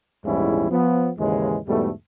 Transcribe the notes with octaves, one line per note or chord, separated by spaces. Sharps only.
A#1 E2 G#2 G3 C#4 E4
F3 B3
D#2 G#2 C#3 E3 G#3
E2 G#2 B2 G3 A3